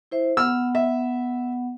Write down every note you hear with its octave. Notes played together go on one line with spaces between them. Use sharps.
E4 C5 E5
B3 F#5 E6 F6
E5